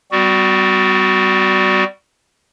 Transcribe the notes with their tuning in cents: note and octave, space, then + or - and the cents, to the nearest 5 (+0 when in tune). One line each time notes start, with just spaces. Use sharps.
G3 -5 B3 +45 F#4 +0